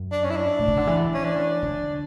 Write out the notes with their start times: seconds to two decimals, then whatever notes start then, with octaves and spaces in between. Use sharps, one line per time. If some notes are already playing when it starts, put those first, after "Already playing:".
Already playing: F#2
0.12 D4
0.24 C#4
0.30 E4
0.37 D4
0.59 A2
0.68 C#3
0.77 D3
0.87 E3
1.14 C#4
1.24 D4
1.62 D3